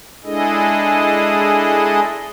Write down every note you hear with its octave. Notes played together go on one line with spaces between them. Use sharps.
G#3 D4 E4 G#4 A4 D#5